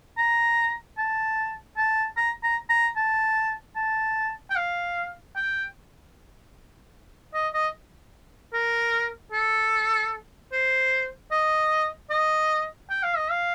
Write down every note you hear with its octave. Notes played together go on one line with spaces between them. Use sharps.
A#5
A5
A5
A#5
A#5
A#5
A5
A5
G5
F5
G5
D#5
D#5
A#4
A4
C5
D#5
D#5
G5
F5
D#5
F5